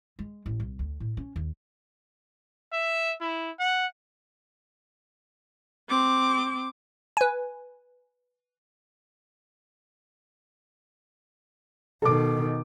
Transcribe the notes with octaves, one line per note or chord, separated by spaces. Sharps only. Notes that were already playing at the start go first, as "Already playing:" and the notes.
G#3
A1
C2
D2
A2
C#4
D#2
E5
E4
F#5
C4 D6
B4 G#5
B2 D#3 A4 D6